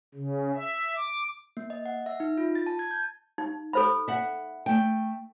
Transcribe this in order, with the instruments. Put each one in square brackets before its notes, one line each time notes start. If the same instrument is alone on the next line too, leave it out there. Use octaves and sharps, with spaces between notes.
[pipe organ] C#3
E5
D6
[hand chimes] A#3
D#5
F#5
E5
D#4
F4
A6
A5
G#6
G6
[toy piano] D#4
A4 C5 B5
[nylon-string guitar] E5 F#5
A3 G5